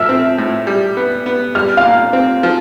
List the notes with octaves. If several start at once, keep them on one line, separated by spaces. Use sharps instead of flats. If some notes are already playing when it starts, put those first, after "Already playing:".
Already playing: F3 E5 E6 F6
C4
A2
G3
B3
B3
G3 F6
F5 F6
A#2
C4
F3